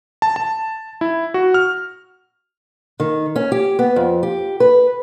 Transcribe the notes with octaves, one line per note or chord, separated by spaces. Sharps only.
A5
A5
E4
F#4
F6
D#3
C#4
G4
B3
F2
G4
B4